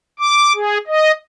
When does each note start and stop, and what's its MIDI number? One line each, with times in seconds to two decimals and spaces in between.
0.19 0.53 86
0.54 0.78 68
0.87 1.12 75